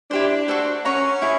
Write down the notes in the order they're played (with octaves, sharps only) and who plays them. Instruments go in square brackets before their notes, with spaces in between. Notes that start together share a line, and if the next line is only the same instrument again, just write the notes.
[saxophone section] D4 [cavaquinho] E4 G4 C5
[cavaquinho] F#4 A4 C5
[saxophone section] C#4 [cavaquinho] A#4 C#5 F#5 A#5
[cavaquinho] E4 G#4 C#5